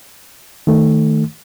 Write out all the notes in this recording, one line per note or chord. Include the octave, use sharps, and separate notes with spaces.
D#3 A3